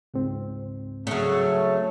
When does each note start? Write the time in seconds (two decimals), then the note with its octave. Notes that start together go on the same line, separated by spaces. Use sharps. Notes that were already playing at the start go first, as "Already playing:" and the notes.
0.14 C#2 G#2 C4
1.07 C#3 F#3 A3